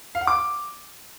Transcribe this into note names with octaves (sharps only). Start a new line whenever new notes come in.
F5
F#5
D6